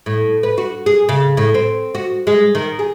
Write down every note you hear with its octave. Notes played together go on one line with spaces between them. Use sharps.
A2
B4
F#4
G#4
C#3
A2
C4
F#4
G#3
D#3
G#4